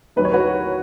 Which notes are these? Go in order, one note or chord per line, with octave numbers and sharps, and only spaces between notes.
D#2 D#3 F#3 B4
C#5
F#4 B4